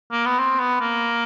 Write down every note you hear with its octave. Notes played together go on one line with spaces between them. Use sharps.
A#3
B3
C4
B3
A#3